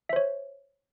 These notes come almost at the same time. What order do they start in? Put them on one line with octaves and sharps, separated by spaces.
E5 C5 C#5